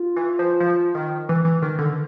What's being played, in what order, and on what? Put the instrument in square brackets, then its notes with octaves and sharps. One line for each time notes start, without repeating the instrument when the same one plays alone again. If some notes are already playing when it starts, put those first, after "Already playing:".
Already playing: [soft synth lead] F4
[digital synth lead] E3
F3
F3
D#3
[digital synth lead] E3 [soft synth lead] B4
[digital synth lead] E3
D#3
D3